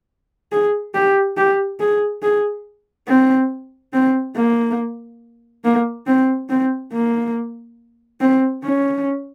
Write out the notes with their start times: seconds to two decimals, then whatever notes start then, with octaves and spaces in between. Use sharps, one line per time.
0.52 G#4
0.94 G4
1.37 G4
1.80 G#4
2.22 G#4
3.08 C4
3.93 C4
4.36 A#3
5.64 A#3
6.07 C4
6.49 C4
6.93 A#3
8.21 C4
8.64 C#4